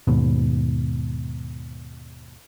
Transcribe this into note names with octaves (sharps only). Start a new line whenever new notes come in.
D#2 G#2 B2